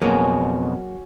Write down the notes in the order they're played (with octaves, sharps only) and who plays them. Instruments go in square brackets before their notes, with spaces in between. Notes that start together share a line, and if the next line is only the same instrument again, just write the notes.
[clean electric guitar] F2 B2 [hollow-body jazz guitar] F#3 A#3 G#4 [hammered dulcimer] C#4 F#4